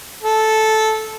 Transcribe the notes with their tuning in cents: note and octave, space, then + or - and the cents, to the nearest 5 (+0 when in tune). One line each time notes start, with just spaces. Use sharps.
A4 -10